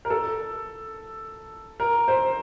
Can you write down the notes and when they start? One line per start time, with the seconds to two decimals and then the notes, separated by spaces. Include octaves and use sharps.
0.05 A#4
0.10 A4
1.80 A#4
2.08 C5